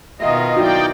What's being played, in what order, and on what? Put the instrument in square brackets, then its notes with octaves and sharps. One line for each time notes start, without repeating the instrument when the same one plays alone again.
[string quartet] B2 D#3 F4 [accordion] D#5 [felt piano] E5
[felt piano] F#3 E4 [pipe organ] D#4 D5 G5